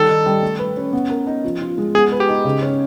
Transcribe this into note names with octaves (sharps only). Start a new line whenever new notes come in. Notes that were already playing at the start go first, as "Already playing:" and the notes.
Already playing: D#3 G3 A4
D#4
G3
A3
B4
C#4
B3
A#4
D#4
F3
F4
G#3
B3 G#4
B4
G4
D#4
C#3
C#4